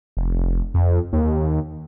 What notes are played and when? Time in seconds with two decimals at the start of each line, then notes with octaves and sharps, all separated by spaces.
0.17 F1
0.74 F2
1.13 D#2